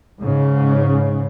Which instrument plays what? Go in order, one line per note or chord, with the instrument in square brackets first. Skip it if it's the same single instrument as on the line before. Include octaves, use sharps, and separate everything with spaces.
[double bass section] G#2 C#3